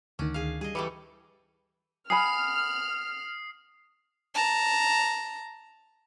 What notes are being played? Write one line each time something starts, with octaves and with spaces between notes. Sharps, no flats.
D2 D#3 C#4 D4
G#4 F5
G3 G#4 D#5
E3 G3 A3 B4 D6 C#7
F#5 G#5 B5 D#6 F6 C7
A5 A#5